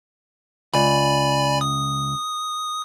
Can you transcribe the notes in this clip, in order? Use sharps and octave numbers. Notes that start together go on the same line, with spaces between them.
C#2 D5 G#5 B5
D#6